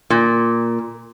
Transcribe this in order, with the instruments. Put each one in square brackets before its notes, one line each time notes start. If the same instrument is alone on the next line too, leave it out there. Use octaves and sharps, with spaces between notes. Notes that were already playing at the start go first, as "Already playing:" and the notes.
[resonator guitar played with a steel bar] A#2